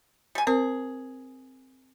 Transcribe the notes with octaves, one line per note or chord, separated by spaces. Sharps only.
G3 G#5
C4 G#4 A#4 C5